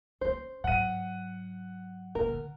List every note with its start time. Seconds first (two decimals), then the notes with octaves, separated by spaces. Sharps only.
0.21 C4 C#4 C5
0.64 G#2 F#3 F#5 D#7
2.15 A#3 A#4
2.28 D3